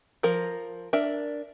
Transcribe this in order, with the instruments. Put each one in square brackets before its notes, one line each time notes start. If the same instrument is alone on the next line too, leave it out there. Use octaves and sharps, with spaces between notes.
[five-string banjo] F3 A#4
D4 A#4 E5